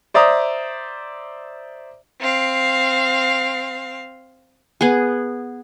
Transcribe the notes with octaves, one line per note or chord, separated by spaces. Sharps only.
C5 D5 E5 A#5 D#6
C4 F5
B3 G#4